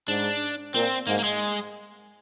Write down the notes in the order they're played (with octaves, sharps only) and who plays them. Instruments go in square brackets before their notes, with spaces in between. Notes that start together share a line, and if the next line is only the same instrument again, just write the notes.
[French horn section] G#2 [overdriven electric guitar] D4
[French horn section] A#2 [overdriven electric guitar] C4
[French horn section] G#2 [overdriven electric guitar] A#3
[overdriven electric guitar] A#3
G#3